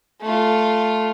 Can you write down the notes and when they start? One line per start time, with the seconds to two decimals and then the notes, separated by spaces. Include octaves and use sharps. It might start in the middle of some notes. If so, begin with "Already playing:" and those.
0.20 A3 F4